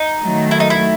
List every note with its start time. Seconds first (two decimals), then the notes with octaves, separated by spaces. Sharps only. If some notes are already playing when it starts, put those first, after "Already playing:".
Already playing: D#4
0.21 D#3 F#3 A3
0.51 E4
0.60 D#4
0.70 E4